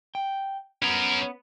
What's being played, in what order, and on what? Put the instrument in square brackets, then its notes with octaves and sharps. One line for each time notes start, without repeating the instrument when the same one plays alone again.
[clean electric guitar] G5
[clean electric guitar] B3 [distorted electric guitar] C#4 A#4